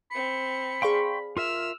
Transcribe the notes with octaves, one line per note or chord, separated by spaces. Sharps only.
C4 B5 C#7
G#4 D5 F5 G5 C6 C#6
F4 A#4 E5 E6 F6